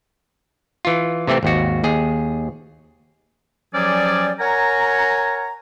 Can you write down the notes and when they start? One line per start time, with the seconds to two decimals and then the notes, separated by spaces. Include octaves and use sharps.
0.85 E3 F4
1.27 C3 E3 A3 C4
1.43 G#1 D#2 F#4
1.84 D#2 G#4
3.74 F3 F#3 C#4 G4 G#4 D5
4.40 A#4 C#5 F#5 G#5 A#5